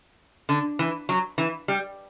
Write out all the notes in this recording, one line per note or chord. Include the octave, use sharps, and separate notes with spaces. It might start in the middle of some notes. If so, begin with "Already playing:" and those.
D3
E3
F#3
E3
G3